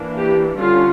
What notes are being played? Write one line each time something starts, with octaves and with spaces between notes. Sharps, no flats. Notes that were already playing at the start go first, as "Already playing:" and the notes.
Already playing: E3 A#3 D4
G4
D3 G3 C#4 F4